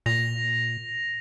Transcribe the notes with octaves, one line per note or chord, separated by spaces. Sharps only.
A#2 A#6 F7